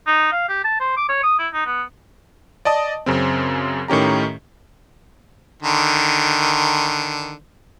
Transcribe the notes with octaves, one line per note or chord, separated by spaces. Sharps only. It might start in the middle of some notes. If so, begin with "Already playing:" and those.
D#4
F5
G4
A5
C5
D6
C#5
D#6
E4
D#4
B3
D5 D#5 A5 D#6
F#2 C#3 C4
A2 D#3 C#4 G4 A#5
D3 D#3